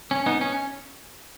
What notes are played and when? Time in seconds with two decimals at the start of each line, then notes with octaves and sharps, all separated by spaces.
0.11 C#4
0.26 B3 D#4
0.41 C#4